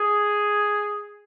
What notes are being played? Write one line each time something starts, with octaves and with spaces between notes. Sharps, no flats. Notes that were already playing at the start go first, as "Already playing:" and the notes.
Already playing: G#4